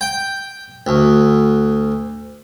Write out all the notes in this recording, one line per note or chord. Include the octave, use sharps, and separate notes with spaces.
G5
D2